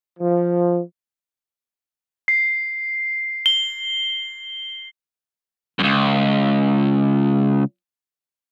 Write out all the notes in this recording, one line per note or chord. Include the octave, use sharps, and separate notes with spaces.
F3
C7
G7
C#2 F#2